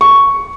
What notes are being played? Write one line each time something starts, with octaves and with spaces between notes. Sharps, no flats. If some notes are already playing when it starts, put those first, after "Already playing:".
C#6